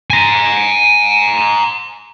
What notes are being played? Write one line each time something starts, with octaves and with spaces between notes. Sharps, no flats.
G#5 A#5